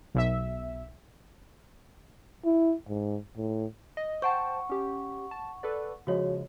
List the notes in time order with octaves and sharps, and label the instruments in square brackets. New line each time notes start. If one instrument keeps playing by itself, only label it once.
[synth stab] B1 E5
[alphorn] E4
G#2
A2
[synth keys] D#5
[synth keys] C5 G5 A5 [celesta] F#5 C#6
[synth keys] C#4 G4
A5
A4 B4 D5
[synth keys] C#3 F3 G#3 [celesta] F#4 C#5